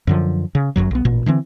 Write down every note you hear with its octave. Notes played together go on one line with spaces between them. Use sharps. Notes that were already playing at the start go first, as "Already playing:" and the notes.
F#2 D3 F3
C#3
G1 C#2 F#2 F#3
B1 B3
A1 A#2
D3 E3 G3 C4